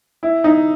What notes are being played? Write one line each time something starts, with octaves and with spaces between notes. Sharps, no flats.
E4
D#4